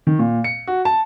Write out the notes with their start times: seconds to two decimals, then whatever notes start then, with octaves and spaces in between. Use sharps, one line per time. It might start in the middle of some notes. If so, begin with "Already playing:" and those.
0.07 D#3
0.19 A#2
0.44 C#7
0.67 F#4
0.85 A5